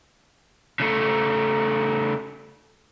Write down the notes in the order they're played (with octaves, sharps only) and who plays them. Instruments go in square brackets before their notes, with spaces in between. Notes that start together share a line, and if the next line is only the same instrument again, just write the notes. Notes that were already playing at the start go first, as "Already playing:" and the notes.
[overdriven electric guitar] C#3 A3